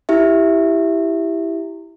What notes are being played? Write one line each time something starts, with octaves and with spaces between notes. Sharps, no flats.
E4 G4 E5